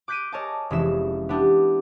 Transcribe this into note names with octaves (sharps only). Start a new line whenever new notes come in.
D6 F#6 G6 B6 D7 D#7
A#4 C#5 D#5 G#5 A5 D6
F1 E3 G#3 C#4 E5 E7
B3 D4 E4 G4